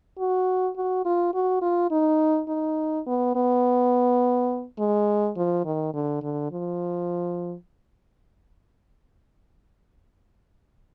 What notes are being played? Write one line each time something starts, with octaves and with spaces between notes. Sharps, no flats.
F#4
F#4
F4
F#4
F4
D#4
D#4
B3
B3
G#3
F3
D#3
D3
D3
F3